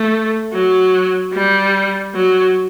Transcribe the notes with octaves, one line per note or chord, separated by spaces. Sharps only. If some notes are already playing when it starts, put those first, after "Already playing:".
Already playing: A3
F#3
G3
F#3